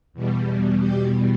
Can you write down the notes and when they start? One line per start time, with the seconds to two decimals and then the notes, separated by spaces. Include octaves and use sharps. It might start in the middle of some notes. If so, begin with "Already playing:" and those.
0.13 E2 B2 G3
0.80 G4